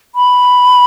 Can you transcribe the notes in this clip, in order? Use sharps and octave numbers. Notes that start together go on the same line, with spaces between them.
B5